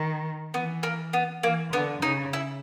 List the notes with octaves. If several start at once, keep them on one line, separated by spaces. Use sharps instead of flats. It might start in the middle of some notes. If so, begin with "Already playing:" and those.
Already playing: D#3
E3 B3
A#3
B3
E3 A#3
D3 B3
C#3 D#4
E4